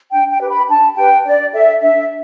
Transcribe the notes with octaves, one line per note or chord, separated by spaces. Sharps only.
D4 G5
G5
G4 B4
B5
D4 A5
G4 B4 G5
D4 D5
A4 E5
D4 E5